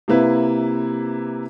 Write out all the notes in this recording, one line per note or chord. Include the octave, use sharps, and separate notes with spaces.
C3 A#3 E4 B4